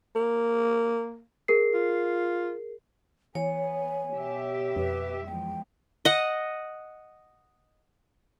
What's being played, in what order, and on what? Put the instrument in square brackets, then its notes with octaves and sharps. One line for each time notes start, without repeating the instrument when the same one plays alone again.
[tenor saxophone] A#3
[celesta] G#4 A#4 C7
[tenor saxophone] F4
[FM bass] E3 [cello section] B3 [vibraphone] C#5 [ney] G#5
[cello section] B2 G4 E5
[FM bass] F2 [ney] B4
[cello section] E2 F3 G#3 [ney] G5
[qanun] D#5 F#5